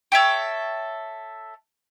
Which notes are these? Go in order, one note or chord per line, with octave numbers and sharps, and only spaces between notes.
A4 C#5 E5 G5